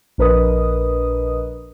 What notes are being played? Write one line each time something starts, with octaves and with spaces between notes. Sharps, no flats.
A#1 D4 A#4 B4 D#5 D#6